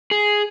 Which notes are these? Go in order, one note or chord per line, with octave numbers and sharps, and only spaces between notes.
G#4